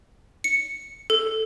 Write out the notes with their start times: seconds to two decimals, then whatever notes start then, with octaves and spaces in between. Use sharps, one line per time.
0.44 C#7
1.10 A4